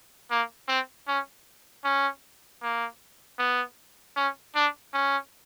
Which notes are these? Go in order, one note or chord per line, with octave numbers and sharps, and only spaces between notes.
A#3
C4
C#4
C#4
A#3
B3
C#4
D4
C#4